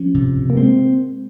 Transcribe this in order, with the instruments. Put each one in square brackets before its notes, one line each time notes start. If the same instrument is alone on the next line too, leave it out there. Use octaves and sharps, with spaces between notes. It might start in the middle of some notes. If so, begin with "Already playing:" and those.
Already playing: [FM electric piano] F3 [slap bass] C#4
[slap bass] C3
C3
[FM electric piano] A#3
[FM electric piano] G#3 [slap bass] C4